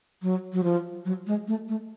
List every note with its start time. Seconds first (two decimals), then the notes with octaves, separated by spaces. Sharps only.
0.22 F#3
0.53 F#3
0.64 F3
1.05 F#3
1.27 G#3
1.48 A3
1.69 A3